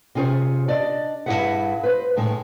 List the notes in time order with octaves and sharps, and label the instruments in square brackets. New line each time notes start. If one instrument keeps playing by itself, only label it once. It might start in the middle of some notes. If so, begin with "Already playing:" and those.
[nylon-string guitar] C3 C#4 F4 G#4 C5
D4 D5 D#5
G2 C#3 E4 G#4 E5 F#5
B4 C5
A2 D#3 G#3